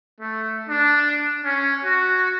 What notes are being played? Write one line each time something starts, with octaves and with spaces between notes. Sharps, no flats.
A3
D4
C#4
F#4